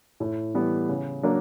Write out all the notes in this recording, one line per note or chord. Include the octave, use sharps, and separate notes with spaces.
A2
E3 G3 B3
C#3
F#3 A#3 D4